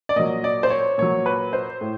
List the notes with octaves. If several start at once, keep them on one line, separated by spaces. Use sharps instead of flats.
D5
A#2 F#3 D#5
D5
C5
C#5
A#2 F#3 C#5
B4
C5
A2